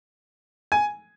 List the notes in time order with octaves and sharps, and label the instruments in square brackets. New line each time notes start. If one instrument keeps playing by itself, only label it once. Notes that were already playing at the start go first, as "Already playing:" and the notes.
[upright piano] G#5